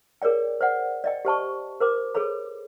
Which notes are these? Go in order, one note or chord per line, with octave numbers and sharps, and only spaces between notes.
G#4 A#4 C#5 D5 G5
C5 D5 F#5
D5 D#5 G5
G4 C5 A5 C#6
A#4 C5 D6
G#4 A4 B4 C#5 B5